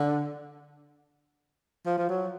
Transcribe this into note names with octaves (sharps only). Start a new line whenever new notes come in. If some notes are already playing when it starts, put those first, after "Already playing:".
Already playing: D3
F3
F3
F#3